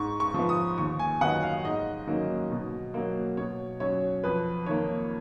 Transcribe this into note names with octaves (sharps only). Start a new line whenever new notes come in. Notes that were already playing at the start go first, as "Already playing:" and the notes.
Already playing: G#2 C#6
C#6
F3 B3
D#6
D#2 C#6
G#5
D#3 F#3 B3 D#4 F#5
F5
G#2 D#5
D#3 F#3 A#3 C#4
B2
F#3 A#3
B2 C#5
F#3 C#4 C#5
F2 B4
D#3 A#3 C#5